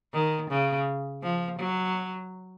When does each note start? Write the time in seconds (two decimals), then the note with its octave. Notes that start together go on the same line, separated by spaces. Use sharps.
0.14 D#3
0.51 C#3
1.23 F3
1.59 F#3